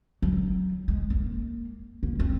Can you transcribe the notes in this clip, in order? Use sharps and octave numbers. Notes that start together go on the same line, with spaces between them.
F#3
G#3
A#3
A#3
C4